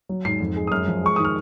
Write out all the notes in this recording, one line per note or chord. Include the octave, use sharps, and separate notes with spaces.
F#3
G#2 C7
F2
G#3
D#6
F#2 F6
F3
G#3 C#6
D#3 D#6
F6